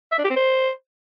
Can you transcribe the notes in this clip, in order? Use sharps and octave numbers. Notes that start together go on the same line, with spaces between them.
E5
D4
G4
C4
C5